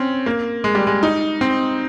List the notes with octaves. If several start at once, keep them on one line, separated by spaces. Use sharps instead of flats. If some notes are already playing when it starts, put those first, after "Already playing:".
Already playing: C4 C#4
A#3
G#3
G3
G#3
D#4
C4